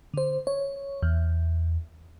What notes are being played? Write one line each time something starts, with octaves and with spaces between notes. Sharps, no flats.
D3 C5
C#5
E2